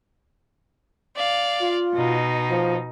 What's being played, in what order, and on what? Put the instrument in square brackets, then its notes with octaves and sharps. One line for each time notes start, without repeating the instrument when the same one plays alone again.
[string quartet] D5 F5
[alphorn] F4
[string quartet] B2 D#4
[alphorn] F3